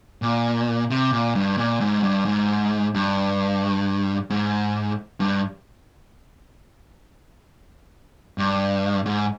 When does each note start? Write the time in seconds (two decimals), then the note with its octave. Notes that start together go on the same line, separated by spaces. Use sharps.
0.22 A#2
0.90 C3
1.12 A#2
1.35 G2
1.58 A#2
1.80 G#2
2.03 G2
2.25 G#2
2.94 G2
4.30 G#2
5.20 G2
8.38 G2
9.06 G#2